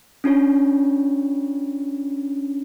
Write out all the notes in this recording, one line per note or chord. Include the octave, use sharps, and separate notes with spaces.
C#4 D4 F4 C#5